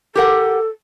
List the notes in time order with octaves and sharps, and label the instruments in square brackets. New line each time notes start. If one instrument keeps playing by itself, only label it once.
[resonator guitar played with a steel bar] G4 A#4 F#5 [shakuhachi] A4